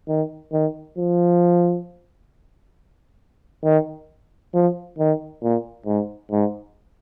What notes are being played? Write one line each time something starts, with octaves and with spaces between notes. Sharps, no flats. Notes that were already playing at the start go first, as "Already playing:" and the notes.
D#3
D#3
F3
D#3
F3
D#3
A#2
G#2
G#2